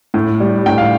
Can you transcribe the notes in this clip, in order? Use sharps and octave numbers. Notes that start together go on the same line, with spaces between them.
A2
G3
A2 G5
F5